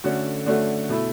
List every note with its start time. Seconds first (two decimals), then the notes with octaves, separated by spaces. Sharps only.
0.04 D3 A3 C#4 F#4
0.46 D3 A3 C#4 F#4
0.89 B2 A3 E4